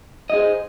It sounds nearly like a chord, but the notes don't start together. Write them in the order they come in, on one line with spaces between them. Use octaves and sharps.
D#5 G#4 C5